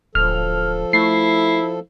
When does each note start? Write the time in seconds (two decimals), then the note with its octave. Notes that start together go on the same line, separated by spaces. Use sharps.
0.15 D1 F3 A4 F6
0.93 A3 E4 C7